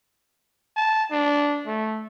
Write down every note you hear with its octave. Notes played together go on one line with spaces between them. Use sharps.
A5
D4
A3